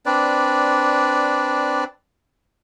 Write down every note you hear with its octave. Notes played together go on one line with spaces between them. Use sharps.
C4 D4 B4 D5